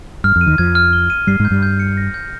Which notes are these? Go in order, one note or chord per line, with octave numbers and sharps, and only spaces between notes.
G2 F6
F2
D#7
D#2 D#3
F2 F3 G#6
F6
G7
D#7
G2 G3 C7
G#2 G#3
G6
G2 G3
G6
C#7
A#6
G6